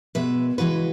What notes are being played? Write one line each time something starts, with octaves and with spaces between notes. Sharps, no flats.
B2 G#3 B4 E5
C#3 E3 G#3 F#4 B4